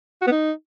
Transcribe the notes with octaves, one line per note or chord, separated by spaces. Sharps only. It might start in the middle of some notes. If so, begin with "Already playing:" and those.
F#4
B3
D#4